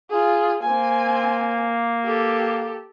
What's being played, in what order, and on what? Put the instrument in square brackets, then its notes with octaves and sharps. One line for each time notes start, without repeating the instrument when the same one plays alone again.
[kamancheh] F4 G#4
[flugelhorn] A#3 [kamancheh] C4 G#5
[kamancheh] G4 A4